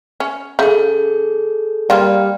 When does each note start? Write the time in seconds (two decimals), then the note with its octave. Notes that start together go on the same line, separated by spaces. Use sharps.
0.20 C#4
0.59 C#3 G#4 A4 G6
1.90 G3 A#3 F4 D5 G5 F6